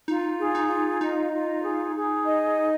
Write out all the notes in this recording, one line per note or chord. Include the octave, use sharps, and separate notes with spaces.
D#4 F4
G#4
D#4
F4
D#4 D#5
F4
G#4
G#4
D#5